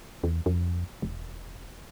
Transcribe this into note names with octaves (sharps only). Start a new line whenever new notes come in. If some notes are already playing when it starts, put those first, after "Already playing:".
E2
F2
E1